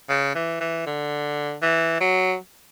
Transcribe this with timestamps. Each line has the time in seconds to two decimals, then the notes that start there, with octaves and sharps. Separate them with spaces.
0.09 C#3
0.35 E3
0.60 E3
0.86 D3
1.62 E3
2.00 F#3